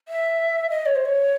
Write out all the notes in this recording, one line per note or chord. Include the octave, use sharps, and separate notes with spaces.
E5
D#5
C#5
C5
C#5